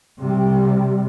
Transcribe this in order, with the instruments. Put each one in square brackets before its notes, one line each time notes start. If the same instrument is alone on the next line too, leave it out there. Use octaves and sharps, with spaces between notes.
[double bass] C3 G3